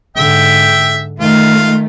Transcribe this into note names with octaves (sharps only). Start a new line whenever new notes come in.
G#2 D3 E5 G5
D#3 A3 F4